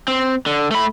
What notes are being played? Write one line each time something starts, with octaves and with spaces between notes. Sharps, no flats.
C4
D3
A3 B5